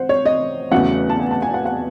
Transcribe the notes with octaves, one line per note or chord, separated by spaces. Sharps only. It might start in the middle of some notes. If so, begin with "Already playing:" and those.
Already playing: C5 F#5
C#5
D#5
E2 C#3 F#3 A3 F#5
A5
G#5
A5
G#5
F#5
F#5